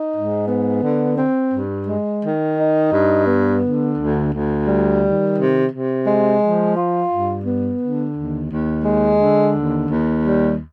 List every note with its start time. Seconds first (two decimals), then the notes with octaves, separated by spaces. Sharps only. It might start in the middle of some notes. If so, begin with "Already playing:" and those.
Already playing: D#4
0.15 G#2
0.48 B3
0.83 D3
1.18 C4
1.53 G2
1.87 G#3
2.22 D#3
2.58 D#4
2.93 G2
3.27 B3
3.62 D3
3.97 D2
4.32 D2
4.67 G3
5.01 D#3
5.37 C3
5.71 C3
6.06 G#3
6.41 F3
6.76 F4
7.10 G2
7.46 B3
7.80 D3
8.15 D#2
8.50 D#2
8.84 G#3
9.19 D3
9.54 D#2
9.89 D#2
10.24 G3